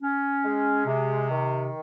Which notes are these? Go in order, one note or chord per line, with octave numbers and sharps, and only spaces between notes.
C#4
G#3
C3
D#3